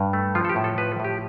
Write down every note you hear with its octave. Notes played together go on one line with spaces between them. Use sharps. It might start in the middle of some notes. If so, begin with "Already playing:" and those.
Already playing: G2
A3
F3 F4
A4
G4
A2
A4
F3 B4
A4
A2 G4